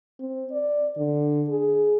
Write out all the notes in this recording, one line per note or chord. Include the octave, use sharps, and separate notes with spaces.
C4
D5
D3
G#4